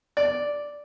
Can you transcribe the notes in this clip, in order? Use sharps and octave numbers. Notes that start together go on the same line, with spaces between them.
D5